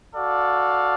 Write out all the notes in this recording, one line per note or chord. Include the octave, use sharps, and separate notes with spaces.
F#4 A4 D5 F5